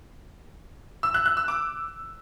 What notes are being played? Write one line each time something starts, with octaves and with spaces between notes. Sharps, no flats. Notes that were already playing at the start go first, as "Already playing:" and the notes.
E6
F#6
F#6
E6
D6